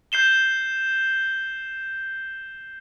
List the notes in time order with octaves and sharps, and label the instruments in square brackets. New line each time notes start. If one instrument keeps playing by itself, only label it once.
[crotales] G6 C7 E7 G7